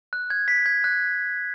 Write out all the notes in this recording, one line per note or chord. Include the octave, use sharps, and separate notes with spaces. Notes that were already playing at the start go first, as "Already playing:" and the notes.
F#6
G#6
B6
G#6
F#6